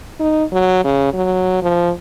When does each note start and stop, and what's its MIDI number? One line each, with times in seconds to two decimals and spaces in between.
0.20 0.44 63
0.52 0.81 54
0.84 1.12 49
1.13 1.59 54
1.63 1.91 53